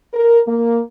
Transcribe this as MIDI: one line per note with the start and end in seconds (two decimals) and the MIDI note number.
0.14 0.40 70
0.47 0.81 58